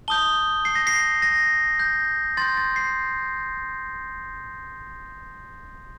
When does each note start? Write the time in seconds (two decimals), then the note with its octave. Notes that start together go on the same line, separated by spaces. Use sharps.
0.08 A5 D#6 G6 G7
0.65 C7
0.75 A#6
0.87 C7
1.22 A#6
1.79 G6
2.37 C6 G6 A6
2.57 A6
2.76 C7